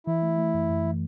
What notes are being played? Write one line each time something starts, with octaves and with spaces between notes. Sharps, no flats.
E3 E4
A3
A3
F#2
F#2
E3